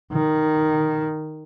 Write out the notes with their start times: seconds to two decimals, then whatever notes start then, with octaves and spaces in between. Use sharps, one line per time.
0.13 D#3